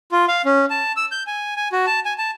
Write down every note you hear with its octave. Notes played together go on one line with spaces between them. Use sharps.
F4
F5
C#4
A5
E6
G6
G#5
G#5
F#4
A5
G#5
A5